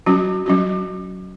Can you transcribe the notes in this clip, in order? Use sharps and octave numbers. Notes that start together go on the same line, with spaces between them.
F#3 C#4 F#4
F#3 C#4 F#4